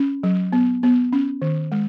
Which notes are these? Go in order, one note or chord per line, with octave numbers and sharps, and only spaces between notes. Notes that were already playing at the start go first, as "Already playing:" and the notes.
Already playing: C#4
F#3
B3
B3
C#4
D#3
G#3